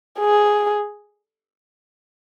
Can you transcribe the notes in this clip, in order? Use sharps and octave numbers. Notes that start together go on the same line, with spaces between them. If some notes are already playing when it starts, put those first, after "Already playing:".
G#4